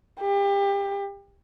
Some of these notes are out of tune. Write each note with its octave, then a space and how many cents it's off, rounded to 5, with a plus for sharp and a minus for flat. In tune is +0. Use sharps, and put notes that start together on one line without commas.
G4 +30